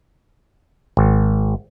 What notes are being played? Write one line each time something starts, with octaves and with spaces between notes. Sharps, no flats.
G#1